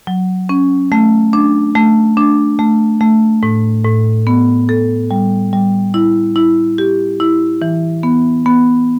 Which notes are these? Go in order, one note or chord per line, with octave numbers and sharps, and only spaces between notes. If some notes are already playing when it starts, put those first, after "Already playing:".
F#3
C#4
A3
D4
A3
D4
A3
A3
A2
A2
B3
A4
G3
G3
E4
E4
G4
E4
E3
B3
B3